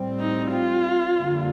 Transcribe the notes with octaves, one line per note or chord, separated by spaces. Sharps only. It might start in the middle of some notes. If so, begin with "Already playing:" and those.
Already playing: A2 G3 C4
D#4
F4
F2 D3 G3 A#3